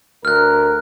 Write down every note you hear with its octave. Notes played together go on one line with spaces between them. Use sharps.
D2 A#4 F6 F#6